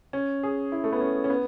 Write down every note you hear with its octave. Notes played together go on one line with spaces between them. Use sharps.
C#4
G#4
E4
A3
B3
C#4
C#4
B3